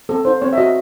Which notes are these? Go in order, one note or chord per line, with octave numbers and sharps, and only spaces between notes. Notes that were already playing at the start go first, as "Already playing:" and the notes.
C4 A4
D#4 C5
C4 C#5
E5
F#4 D#5